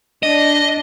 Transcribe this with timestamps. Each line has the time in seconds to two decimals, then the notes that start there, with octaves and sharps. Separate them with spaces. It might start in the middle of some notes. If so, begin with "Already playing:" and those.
0.23 D4 D#5